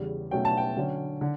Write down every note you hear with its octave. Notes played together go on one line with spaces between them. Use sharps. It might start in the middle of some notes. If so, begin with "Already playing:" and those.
Already playing: E2 C#3 G3
B2 F#3 A3 C#4 G5
A5
G5
D3 F#3 C#4
D3